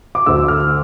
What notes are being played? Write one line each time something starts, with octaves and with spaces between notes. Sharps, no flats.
D6
D2 D3 A3 E6
F6